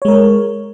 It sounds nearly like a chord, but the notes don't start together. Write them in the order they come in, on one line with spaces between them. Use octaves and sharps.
C#5 G#3 A#4